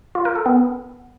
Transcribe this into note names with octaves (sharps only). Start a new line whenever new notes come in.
F4
A#4
A4
B3